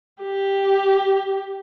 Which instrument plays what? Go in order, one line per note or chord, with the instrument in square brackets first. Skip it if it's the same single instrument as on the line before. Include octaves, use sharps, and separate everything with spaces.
[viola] G4